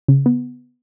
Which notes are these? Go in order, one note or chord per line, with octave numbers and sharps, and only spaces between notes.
C#3
B3